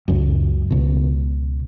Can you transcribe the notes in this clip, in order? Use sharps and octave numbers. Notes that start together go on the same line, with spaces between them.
C#2 F#2
C#2 B2